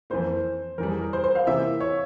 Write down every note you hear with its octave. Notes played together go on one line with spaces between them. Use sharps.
F2 E3 A#3 C5
F2 E3 G3 A#4
G#4
A#4
C5
C5
F5
C3 E3 A#3 E4 E5
C#5